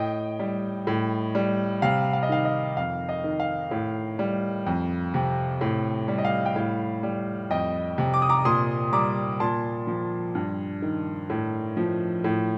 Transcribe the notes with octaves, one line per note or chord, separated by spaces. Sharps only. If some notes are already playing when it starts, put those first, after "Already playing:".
Already playing: A2 D#5 G5
G3
A2
G3
C3 F5
F5
D#5
D#3 F5
D#5
F2 F5
D#5
D#3
F5
A2
G3
F2
C3
A2
G3
D#5
F5
G5
A2 F5
G3
F2 D#5 G5
C3
D6
D#6
A#5 D6
A#2 C6 D#6
G3 A#5 D6
A#2 A5 C6
F3
G2
D#3
A2
F3
A2